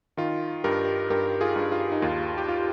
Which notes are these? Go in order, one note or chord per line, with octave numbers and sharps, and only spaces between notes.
D#3 F4
G2 G4 A#4
G2 G4 A#4
F4 G#4
G2
F4
D#4
D#2 F4
G4
F4